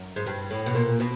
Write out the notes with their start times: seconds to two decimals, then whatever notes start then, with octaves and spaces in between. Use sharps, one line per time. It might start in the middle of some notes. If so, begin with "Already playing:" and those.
Already playing: F#2
0.16 G#2
0.27 G2
0.51 A2
0.66 B2
0.75 A#2
1.00 B2